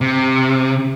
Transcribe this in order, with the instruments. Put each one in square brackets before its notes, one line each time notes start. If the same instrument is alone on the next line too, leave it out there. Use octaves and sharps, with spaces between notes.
[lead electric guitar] C3